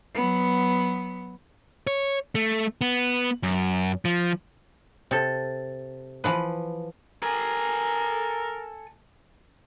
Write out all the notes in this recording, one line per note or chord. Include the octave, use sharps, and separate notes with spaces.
F#3 B3
C#5
A3
B3
F#2
F3
C3 A4
E3 F3 B4
A4 A#4 G#5